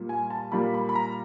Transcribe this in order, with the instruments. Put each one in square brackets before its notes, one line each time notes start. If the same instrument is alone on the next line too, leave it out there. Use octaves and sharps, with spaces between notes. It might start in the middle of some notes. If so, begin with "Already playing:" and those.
Already playing: [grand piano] A#2 G3 A#3
G#5
A5
A#2 G3 A#3 B5
B5
B5
A#5